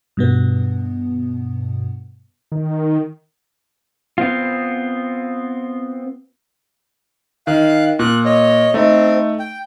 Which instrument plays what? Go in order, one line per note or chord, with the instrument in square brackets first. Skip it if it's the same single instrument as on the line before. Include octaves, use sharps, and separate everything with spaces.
[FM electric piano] G2 B2 B3
[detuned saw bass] D#3
[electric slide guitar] B3 C4 F4
[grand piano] D#3 [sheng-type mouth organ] F5 F#6
[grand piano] A#2 [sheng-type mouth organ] F#6
[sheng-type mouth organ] C#5 D#5
[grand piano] A3 D#4 [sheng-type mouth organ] C4
[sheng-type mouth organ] G5